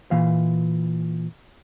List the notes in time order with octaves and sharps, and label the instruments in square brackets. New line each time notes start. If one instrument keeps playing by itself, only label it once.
[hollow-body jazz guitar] A#2 E3 F5